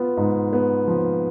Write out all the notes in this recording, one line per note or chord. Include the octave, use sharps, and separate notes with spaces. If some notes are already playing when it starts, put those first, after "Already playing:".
Already playing: B3 F4
G#2
B3
F3